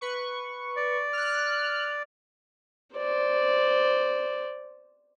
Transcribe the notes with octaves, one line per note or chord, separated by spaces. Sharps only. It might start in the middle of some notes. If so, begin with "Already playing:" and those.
B4 C#6
D5
F6 F#6
C5 D5